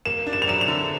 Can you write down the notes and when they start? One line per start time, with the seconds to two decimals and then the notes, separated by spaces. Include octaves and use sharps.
0.05 A#3 E7
0.27 D4
0.33 E7
0.42 F7
0.47 F#3 E7
0.61 F7
0.68 D3